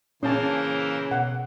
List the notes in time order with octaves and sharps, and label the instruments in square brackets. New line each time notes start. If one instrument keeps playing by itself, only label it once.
[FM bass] A#2 [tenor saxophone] C#3 [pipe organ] E3 A#3 C5 [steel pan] C#4 A5
[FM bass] B2 [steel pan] F#5